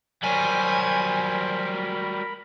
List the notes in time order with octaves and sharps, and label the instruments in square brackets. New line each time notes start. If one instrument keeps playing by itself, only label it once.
[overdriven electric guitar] F#3 G3 [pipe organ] A#4 B5 [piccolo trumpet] C5 [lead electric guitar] G#5